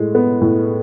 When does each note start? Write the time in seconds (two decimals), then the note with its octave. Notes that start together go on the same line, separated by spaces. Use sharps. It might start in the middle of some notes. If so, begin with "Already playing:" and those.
Already playing: A2 G#3
0.15 B3
0.41 A2